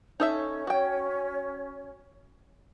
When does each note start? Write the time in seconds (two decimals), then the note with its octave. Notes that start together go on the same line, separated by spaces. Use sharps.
0.20 C#4 D#4 A4 C#5 E5
0.67 F#4 G5